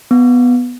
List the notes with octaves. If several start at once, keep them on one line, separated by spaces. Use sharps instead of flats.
B3